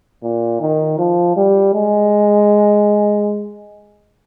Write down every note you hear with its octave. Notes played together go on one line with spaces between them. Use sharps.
A#2
D#3
F3
G3
G#3